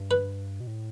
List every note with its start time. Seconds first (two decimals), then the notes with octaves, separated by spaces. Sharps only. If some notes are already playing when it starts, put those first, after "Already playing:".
Already playing: G2
0.11 B4
0.60 B2
0.67 A2